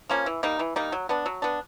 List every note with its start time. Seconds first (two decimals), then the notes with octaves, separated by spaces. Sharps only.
0.09 F3 A#3 C#4
0.26 E3
0.43 G3 A#3 D#4
0.59 E3
0.76 G3 A#3 D#4
0.92 F#3
1.09 B3 D4
1.26 F#3
1.42 B3 D4